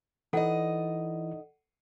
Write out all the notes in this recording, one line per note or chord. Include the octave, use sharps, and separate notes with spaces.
E3 D#4 E4 A4 D5 D#5 F#5